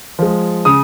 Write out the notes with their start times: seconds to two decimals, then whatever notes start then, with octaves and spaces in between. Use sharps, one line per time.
0.19 F3 G#3
0.65 C#3 D#6